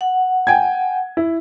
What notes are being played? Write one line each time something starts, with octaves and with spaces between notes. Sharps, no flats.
F#5
G5 G#5 G#6
E4